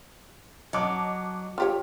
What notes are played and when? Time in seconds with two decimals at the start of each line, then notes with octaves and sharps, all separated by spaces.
0.73 F#3 D#5 A5 D6
1.58 F4 G4 C#5